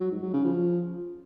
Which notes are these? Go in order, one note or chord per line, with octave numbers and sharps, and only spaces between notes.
F#3
G#2
F#3
C#3
F3